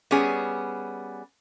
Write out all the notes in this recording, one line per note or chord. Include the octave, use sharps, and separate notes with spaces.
G3 B3 C#4 G#4